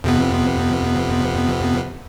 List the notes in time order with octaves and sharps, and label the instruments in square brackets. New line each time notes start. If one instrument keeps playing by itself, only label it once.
[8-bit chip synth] F2 C3 B3